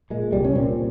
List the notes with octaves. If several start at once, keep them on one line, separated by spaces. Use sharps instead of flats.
A#2 G#3
C2 G3
C#4
A#2 C4